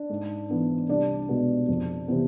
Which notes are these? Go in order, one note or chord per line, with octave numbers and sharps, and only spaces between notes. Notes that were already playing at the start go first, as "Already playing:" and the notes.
Already playing: D4 D5
G#2
E3 B3 D4
C2 D4 D5
B2 G#3 B3
F2
C3 E3 B3